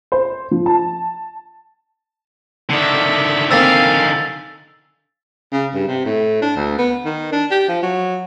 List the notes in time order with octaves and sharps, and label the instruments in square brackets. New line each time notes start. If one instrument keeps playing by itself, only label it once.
[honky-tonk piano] C5
F3
A5
[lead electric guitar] D3 D#3 [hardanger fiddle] D5 E5
[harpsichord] A#3 C4 C5 [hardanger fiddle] F5 G#5 [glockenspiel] E6 A6 B6
[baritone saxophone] C#3
G2
C3
A2
D4
D2
B3
D#3
D4
G4
F3
F#3